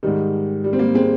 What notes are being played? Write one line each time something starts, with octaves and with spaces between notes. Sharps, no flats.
G#2 D#3 G3
G3
C4
G3 A#3
G#3 C4